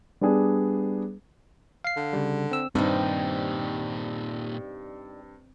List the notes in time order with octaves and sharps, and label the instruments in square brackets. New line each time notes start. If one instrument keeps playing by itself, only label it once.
[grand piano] G3 B3 D4 G#4
[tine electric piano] F5 C7
[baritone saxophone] D3
[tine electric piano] C#3 G3
C4 E6
[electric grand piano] G2 [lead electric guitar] A#2 D#3 [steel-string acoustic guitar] G3 D#4 [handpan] C4